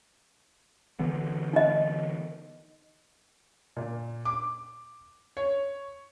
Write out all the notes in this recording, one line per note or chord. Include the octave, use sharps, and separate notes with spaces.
D3 E3 B3
D#4 D#5
A#2
D6
C#5